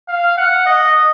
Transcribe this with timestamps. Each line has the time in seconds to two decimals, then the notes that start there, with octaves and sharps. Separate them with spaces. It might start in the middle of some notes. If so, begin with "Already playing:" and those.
0.09 F5
0.37 F#5
0.66 D#5